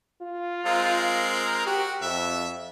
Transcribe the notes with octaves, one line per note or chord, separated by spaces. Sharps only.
F4
G#3 C4 A#4
F#4 G4
F2 E5